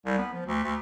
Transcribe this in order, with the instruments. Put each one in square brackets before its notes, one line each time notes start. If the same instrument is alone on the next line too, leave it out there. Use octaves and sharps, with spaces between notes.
[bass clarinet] C2
B3
F3
D2
D2